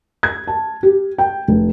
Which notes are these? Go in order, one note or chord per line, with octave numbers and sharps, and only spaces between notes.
G#6
A5
G4
G5
F1